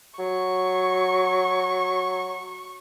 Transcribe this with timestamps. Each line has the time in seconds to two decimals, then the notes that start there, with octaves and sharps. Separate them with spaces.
0.19 F#3 C#6